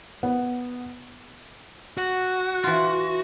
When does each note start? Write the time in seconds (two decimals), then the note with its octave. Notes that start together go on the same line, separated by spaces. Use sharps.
0.23 B3
1.97 F#4
2.63 E3 F4